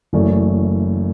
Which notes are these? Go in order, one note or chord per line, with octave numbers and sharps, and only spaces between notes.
F#1 F#2 E3 A3 D5